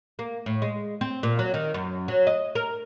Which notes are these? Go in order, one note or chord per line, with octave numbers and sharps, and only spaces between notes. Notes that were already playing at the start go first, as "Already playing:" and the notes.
A#3
A2
G#3
C4
A#2
F#3
D#3
F#2
F#3
D#5
A#4